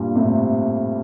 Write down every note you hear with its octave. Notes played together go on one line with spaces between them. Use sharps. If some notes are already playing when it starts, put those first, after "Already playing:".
Already playing: G2 A#2
A2 C3